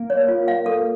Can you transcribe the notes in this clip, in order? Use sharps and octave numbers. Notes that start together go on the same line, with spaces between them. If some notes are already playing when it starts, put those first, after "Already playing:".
Already playing: A#3
C#5
F4
F5
A4